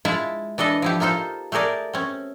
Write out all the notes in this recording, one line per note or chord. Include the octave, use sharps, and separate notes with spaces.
G#3 E4 F4 E5 A5
E3 D4 A4 D#5
F3 E4 G4
A#3 D#4 F4 A4 C5
A3 G4 G#4 A#4 D5
C4 C#4